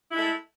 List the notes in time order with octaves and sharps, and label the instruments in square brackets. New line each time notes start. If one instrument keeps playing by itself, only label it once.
[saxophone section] E4
G#3
A3